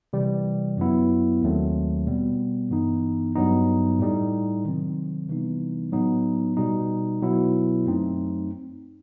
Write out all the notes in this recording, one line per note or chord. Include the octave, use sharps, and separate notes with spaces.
C3 E3 G3
F#2 F#3 B3 E4
D#2 D#3 F#3 A3 C4
B2 G3 B3
G2 E3 B3 D#4
G2 F#3 B3 D#4
A2 G3 D#4
C3 D#3 F#3 C4
C3 E3 G3 B3 D#4
A2 F#3 B3 D#4
B2 G3 D#4
B2 F#3 B3 E4
F#2 F#3 A3 C4 D#4